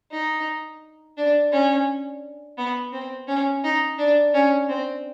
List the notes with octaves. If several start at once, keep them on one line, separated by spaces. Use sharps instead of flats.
D#4
D4
C#4
B3
C4
C#4
D#4
D4
C#4
C4